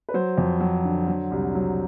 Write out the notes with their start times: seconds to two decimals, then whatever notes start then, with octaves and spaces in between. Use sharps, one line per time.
0.09 B4
0.14 F#3 C5
0.38 F2
0.60 F#3
0.84 D3
1.08 F#3
1.31 C2
1.55 F#3